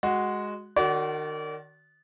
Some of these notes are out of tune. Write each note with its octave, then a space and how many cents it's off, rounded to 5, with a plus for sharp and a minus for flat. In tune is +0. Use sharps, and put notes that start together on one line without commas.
G#3 +0 F#4 +0
D#3 -30 F#4 +20 D5 -35